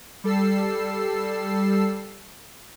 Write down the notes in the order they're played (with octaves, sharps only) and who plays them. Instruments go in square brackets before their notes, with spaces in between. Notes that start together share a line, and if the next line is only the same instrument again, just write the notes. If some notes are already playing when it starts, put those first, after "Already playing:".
[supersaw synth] G3 A4 E6 C7